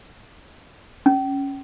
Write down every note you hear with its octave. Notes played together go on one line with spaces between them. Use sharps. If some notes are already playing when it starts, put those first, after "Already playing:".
C#4